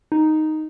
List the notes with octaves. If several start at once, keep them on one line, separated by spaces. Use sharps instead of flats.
D#4